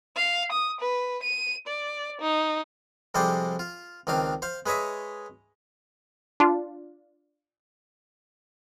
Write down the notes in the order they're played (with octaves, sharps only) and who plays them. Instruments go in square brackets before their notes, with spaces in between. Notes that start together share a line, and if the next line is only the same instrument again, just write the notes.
[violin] F5
D#6
B4
D#7
D5
D#4
[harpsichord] F2 C3 G3 G#3 C5 D5
F4
C#2 D#3 C4 D4 F5
C5 F5
G#3 B4 C#5 D#5 E5
[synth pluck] D4 F4